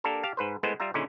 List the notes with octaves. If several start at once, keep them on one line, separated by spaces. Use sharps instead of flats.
A#3 D4 G4 A4 A#4
G4 F5 A5
G#2 B4 C5
G#3 A3 B3 E4 C5
G3 F4 E5 A#5
A#2 D3 D#3 C#4 E4 G#4